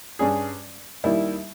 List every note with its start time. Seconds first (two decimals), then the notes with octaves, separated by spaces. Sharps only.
0.19 G2 G3 C#4 G#4
1.04 D#2 D#3 G3 E4